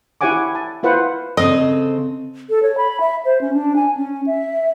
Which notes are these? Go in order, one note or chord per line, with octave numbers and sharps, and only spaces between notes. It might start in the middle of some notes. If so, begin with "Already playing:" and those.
E4 G4 C#5 F#5 G#5 D6
A5
E4 F4 B4 C5 F#5
C#3 C4 A4 D#5
A4
C#5
B5
E5
C5
C#4
D4
G#5
C#4
E5